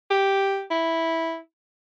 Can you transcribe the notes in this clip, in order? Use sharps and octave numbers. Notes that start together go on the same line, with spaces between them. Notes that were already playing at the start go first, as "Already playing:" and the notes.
G4
E4